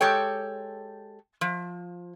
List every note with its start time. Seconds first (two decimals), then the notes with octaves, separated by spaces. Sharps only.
0.01 G#3 G4 A4 C#5 G5
1.41 F3